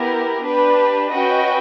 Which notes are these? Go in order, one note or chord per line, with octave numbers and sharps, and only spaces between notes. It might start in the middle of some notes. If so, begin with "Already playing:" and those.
Already playing: B3 E4 G4 A#4
D4 G4 B4
C#4 F#4 B4 D#5 G5